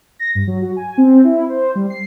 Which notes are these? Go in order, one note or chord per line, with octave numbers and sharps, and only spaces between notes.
A#6
G2
F#3
F#4
G#5
C4
E4
C5
G3
C7